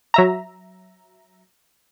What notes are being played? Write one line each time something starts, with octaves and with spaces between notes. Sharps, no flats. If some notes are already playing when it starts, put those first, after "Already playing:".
F#3 E5 A#5